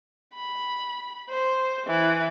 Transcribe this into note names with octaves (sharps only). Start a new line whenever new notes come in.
B5
C5
E3